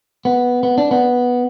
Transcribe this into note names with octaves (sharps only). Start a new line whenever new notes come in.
B3
B3
D4
B3